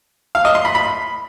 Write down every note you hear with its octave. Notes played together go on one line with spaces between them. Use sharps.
F5
D#5
C6
B5
B5